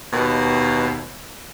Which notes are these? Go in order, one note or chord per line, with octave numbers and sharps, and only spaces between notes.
D#2 B2